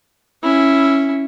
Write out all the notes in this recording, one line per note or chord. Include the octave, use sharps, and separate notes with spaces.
C#4 E4